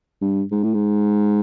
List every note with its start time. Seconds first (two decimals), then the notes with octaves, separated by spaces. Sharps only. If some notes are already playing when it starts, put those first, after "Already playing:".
0.21 G2
0.51 G#2
0.63 A2
0.74 G#2